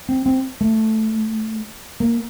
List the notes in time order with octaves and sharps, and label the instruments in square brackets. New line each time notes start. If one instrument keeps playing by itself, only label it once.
[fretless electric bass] C4
C4
A3
A#3